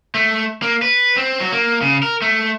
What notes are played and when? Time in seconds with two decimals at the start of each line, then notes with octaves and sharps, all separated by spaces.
0.15 A3
0.62 A#3
0.82 B4
1.17 C4
1.40 F#3
1.52 A#3
1.82 C#3
2.03 A#4
2.22 A3